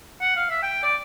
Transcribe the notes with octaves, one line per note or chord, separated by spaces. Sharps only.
F#5
F5
E5
G5
D5